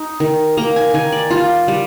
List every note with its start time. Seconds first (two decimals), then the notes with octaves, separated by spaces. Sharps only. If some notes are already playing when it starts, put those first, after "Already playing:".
Already playing: D#4
0.20 D#3
0.57 A#3 A#5
0.76 G#5
0.94 D#3 G#5
1.12 D5
1.30 G3 F4
1.68 G3